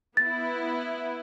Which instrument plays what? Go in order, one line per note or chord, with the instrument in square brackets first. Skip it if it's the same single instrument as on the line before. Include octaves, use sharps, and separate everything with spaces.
[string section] B3 E4 [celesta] A6